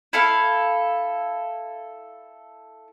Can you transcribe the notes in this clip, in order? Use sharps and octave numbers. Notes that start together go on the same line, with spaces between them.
E4 A4 F5